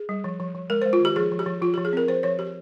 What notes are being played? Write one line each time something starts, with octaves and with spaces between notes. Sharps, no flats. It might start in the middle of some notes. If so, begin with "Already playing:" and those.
Already playing: G#4
G3
F3
F3
F3
G#3 A#4
G#3 C5
F4
D#3 G4
F3 G#4
F3
G4
F3
F3 F4
F3 G4
G#4
C4 A#4
F3 C5
F3 C#5
F3 G4